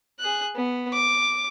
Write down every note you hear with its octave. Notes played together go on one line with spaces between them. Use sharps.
G#4 F#6
B3
D6